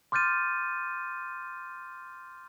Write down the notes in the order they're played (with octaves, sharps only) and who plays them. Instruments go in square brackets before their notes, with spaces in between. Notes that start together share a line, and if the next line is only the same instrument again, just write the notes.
[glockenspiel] C6 D6 F6 G6 A6 D#7